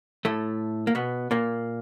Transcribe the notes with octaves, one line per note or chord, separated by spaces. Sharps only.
A2 A3
A#3
B2 B3
A#2 A#3